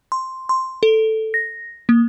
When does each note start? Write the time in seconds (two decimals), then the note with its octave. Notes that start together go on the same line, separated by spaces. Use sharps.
0.12 C6
0.49 C6
0.83 A4
1.34 A#6
1.89 A#3